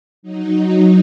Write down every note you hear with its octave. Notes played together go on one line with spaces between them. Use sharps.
F#3 D#4